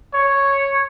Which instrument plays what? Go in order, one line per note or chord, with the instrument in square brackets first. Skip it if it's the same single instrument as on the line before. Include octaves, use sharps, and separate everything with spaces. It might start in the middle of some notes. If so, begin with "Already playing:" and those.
[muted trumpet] C#5